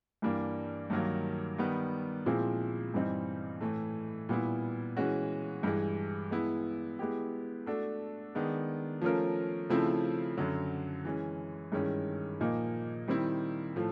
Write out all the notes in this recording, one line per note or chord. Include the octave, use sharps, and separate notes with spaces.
G2 E3 G3 A#3 D4
G2 D#3 F#3 A#3
D#3 G3 B3
A#2 F3 G#3 C4 E4
G2 E3 G3 C4 D#4
A2 E3 A3
A#2 G3 B3 E4
E3 G#3 C#4 F#4
G2 E3 G#3
G#3 B3 E4
G#3 B3 E4 G4
A3 D4 F#4 A4
D#3 G#3 B3 D4
F3 A3 C#4 F4 A#4
C#3 F3 A3 C4 E4
F#2 D3 F#3
E3 G#3 C#4
G2 D#3 G#3 C#4 E4
A#2 F3 A#3 D#4
D#3 G3 C4 E4
A2 F3 A3